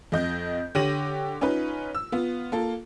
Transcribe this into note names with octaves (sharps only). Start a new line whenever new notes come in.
F2 D#5 G6
D3 G4 C#5 A#6 D#7 F#7
C#4 D#4 F4 B4
E6
B3 F4
A#3 F4 A4